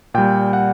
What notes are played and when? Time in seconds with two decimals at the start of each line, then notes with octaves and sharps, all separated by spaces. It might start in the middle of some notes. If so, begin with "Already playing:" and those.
0.14 A#2 G3 G5
0.53 F#5